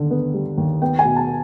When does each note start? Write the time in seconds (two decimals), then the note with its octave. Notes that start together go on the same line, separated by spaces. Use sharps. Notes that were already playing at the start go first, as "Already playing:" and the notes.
Already playing: D#2 D3
0.11 B3
0.34 G3
0.58 D#2
0.82 B3 G5
0.99 G#5
1.05 B2
1.16 A5